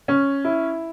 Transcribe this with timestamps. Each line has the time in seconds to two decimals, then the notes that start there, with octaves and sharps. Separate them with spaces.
0.08 C#4
0.45 E4